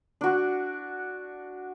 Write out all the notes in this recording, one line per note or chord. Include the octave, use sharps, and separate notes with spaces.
D4 F#4